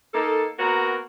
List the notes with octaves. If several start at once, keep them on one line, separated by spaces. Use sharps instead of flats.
A#3 D#4 A4
A#3 B3 F#4 A#4